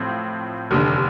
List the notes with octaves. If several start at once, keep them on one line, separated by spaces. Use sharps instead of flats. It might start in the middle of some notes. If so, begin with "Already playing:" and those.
Already playing: A2 F3 C4
F1 D#2 D3